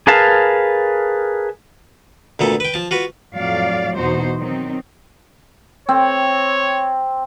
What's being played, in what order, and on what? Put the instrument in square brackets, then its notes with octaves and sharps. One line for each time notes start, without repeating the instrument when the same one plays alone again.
[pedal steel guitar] G#4 A#4 B4 F5 A5
[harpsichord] D2 A#2 B3 A4
B4 G5
F3 A5
F4 F#4 B4
[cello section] F2 A2 F#3 D5 F5
E2 B2 D#4 F#4 C5
D#3 F#3 C4 D#4
[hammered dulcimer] C4 [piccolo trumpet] C#5